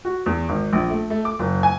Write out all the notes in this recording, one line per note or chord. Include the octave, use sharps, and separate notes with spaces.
F#4
E2
G#1
A#1
A3
A3
D6
F#1
G#5